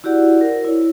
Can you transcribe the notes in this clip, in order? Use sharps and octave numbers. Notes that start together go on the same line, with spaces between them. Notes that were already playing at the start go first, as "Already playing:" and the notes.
E4 F#4 G4 D5 F#5
A#4 C5
E4 C#5